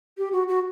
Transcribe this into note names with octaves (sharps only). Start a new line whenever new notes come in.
G4
F#4
F#4